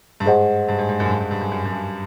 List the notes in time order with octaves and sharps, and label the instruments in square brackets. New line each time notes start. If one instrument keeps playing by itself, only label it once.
[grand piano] G2
[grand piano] G#2 [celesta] G#4 C5 D#5 F#5
[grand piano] G2
G#2
G#2
F#2
G#2
G2
G2
G2
F#2
F#2
F#2
G2